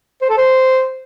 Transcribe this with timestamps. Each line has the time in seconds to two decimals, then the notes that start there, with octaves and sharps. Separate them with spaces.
0.21 C5
0.29 A4
0.37 C5